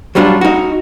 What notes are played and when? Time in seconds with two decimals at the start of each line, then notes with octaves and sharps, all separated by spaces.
0.15 F#3 G3 B3 D4 F4
0.41 D#4 F#4